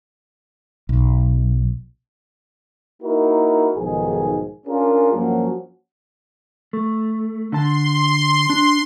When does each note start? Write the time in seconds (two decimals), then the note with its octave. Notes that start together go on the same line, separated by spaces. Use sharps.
0.89 B1
3.02 A#3 D#4 E4 F#4 A#4
3.77 B1 G#2 D#3 F3 G#4
4.67 C#4 D4 F4 G#4 A#4
5.13 G2 F3 F#3 A#3 C#4 F#4
6.73 A3
7.52 D3 A5 C6
8.50 D4